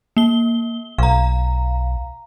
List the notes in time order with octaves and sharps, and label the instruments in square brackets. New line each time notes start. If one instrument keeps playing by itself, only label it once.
[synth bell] A#3 G7
[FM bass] B1 [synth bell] F5 A#5